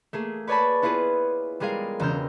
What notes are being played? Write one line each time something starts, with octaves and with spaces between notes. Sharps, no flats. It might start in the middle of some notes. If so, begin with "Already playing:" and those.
A3 A#3 G#4
B4 C#5 D5 G#5 A5 B5
B3 E4 F4 G#4 B4
G3 G#3 G#4 A#4 F5
E1 C#3 A#5 E6 F6 G6